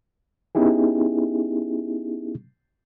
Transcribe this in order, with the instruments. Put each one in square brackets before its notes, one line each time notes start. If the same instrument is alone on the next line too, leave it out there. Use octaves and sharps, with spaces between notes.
[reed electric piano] B3 C#4 D#4 E4 G4 G#4